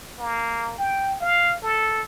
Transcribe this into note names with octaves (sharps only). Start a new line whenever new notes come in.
A#3
G5
F5
A4